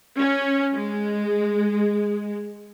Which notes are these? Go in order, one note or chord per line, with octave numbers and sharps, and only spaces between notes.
C#4
G#3